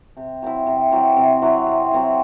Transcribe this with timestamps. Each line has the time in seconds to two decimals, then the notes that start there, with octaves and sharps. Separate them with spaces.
0.17 C3
0.42 F#3 C4 E4
0.67 C3
0.92 F#3 C4 E4
1.17 C3
1.42 F#3 C4 E4
1.67 C3
1.92 F#3 C4 E4